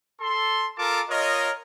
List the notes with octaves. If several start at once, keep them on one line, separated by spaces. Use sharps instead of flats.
A4 C6
F4 A4 A#4 A5 D6
F4 A#4 C#5 D#5